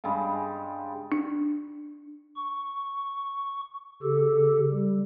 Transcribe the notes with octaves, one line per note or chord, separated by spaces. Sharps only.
G2 C#3 G3 G#3
D4
C#6
C#3 G4 A4
G3